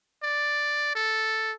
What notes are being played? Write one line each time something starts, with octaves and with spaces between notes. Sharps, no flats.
D5
A4